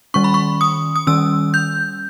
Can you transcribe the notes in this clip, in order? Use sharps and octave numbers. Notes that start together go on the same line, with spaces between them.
D#3 G3 C#4 C#6
B5
C#6
D#6
D#6
D#3 G3 C#4 E6
G6